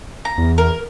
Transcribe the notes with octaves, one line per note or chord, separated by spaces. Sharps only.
A#5
E2
A#4